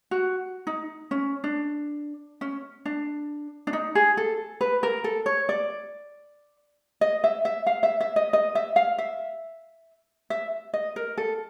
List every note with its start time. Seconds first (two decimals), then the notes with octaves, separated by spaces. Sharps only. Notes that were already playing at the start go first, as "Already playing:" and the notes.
0.11 F#4
0.67 D#4
1.11 C#4
1.44 D4
2.41 C#4
2.85 D4
3.67 D4
3.73 D#4
3.95 G#4
4.17 A4
4.61 B4
4.83 A#4
5.04 A4
5.26 C#5
5.49 D5
7.01 D#5
7.24 E5
7.45 E5
7.67 F5
7.83 E5
8.01 E5
8.16 D#5
8.33 D#5
8.55 E5
8.76 F5
8.98 E5
10.30 E5
10.74 D#5
10.96 A#4
11.18 A4